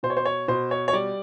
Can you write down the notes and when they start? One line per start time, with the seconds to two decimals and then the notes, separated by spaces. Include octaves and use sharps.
0.03 B2 C5
0.10 C#5
0.17 C5
0.26 C#5
0.48 B2 C5
0.71 C#5
0.88 C#5
0.93 G3 D5